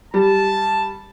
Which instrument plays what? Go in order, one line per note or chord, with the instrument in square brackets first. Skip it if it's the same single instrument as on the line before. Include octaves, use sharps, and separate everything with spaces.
[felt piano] G3 [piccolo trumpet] A5